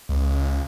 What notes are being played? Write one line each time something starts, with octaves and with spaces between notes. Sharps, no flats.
C#2